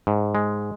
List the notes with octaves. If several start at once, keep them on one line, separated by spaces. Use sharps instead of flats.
G#2
G#3